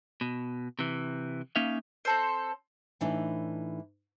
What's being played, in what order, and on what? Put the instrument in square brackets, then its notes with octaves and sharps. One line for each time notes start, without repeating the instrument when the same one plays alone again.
[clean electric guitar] B2
C3 E3
A#3 C#4 D#4 E5 F5
[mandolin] C4 A4 C5
[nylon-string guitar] A2 E3 D4 D#4